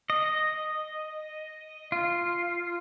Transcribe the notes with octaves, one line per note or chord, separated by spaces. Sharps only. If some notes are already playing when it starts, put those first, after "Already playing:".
D#5
F4